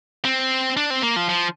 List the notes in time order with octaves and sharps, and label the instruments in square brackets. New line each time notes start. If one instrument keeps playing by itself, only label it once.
[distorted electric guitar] C4
D4
C4
A#3
F3
F3